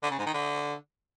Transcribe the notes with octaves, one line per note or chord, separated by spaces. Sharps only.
D3
C#3
G#2
D#3
D3